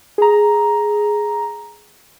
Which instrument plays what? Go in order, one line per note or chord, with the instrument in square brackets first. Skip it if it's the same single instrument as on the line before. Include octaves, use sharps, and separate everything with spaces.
[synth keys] G#4 A#5